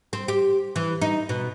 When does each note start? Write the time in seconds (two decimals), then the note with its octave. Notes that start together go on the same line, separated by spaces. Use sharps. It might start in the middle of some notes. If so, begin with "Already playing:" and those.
0.13 C4
0.28 G4
0.76 E3
1.02 D#4
1.29 B2